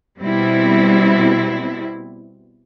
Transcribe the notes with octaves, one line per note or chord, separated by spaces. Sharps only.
B2 G3 C4 E4